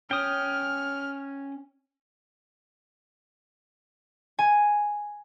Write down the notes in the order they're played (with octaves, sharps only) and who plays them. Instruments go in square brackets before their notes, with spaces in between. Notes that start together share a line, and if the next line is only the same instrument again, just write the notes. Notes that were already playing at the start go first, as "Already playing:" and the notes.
[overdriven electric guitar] C#4 [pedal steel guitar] G5 D#6 [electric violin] F6
[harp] G#5